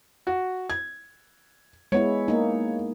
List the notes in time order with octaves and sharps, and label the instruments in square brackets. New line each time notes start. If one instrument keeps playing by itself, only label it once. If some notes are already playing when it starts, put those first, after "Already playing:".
[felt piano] F#4
G#6
[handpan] G#3 B3 E4 [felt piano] C#5
[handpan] A#3 D#4